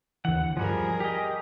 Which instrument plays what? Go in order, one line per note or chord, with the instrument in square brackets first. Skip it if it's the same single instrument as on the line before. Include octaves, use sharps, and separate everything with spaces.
[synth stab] D#2 D3 E3 [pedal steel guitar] F#5
[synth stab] E2 G2 [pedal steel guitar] F3 G3 [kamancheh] G#4 A#4
[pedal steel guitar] G4 D#5